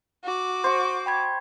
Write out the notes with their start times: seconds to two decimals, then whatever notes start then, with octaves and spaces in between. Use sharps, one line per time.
0.24 F#4 D6
0.64 C5 C#6
1.06 G5 B5 G#6